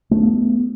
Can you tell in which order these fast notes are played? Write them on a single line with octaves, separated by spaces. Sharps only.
A3 C#4 B3